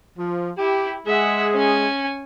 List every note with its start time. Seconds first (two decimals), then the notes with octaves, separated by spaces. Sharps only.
0.18 F3
0.57 E4 G4
1.07 G#3 G#4 E5 F#5
1.54 C#4 G#5